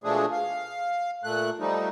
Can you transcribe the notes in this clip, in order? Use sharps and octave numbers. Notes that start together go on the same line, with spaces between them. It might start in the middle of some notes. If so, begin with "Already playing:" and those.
B2 F3 G#3 A3 D4 G#4
F5
A#2 A3 F#6
F3 G3 A3 D#4